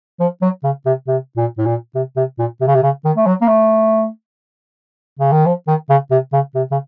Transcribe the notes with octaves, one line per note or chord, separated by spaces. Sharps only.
F3
F#3
C#3
C3
C3
A#2
A2
A#2
C3
C3
A#2
C3
C#3
C3
C#3
D#3
A3
F#3
A#3
A3
C#3
D#3
F3
D#3
C#3
C3
C#3
C3
C#3